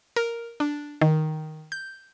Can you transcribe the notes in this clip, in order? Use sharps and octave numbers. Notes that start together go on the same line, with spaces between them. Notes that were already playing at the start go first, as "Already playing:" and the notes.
A#4
D4
D#3
G6